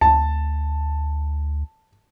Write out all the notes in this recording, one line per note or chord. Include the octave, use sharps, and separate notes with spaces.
D2 A5